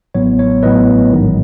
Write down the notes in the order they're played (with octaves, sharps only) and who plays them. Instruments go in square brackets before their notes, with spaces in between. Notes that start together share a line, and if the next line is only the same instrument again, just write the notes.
[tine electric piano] A1 A2 F#3 B3 C#5
C#5
A1 A2 F#3 B3 B4 D#5
A1 G#2 D#3 F#3